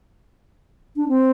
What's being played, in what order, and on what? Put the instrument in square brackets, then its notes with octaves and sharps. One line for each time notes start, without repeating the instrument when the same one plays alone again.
[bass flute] D4
C4